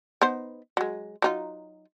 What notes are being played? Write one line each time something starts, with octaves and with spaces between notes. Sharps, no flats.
B3 D#4 C5
F#3 G#3
F#3 D#4 F4